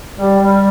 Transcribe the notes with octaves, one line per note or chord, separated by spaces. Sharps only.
G3
G3